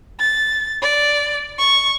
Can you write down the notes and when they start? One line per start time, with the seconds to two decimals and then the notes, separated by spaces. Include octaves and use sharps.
0.19 A6
0.82 D5
1.58 C#6